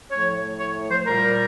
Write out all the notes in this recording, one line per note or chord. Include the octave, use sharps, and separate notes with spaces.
A2 F3 A3 C#5
C#5
C5
A#2 G3 A#4